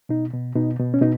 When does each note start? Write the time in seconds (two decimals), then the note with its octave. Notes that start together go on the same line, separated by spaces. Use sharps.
0.09 B2 D#4
0.33 B2
0.56 B2 D#4
0.79 B2
0.94 C#4
1.02 B2 D#4